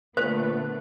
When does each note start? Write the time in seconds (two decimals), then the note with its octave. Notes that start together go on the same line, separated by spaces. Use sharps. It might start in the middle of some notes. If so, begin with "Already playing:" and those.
0.17 A#2 D3 A3 B3 B4 C5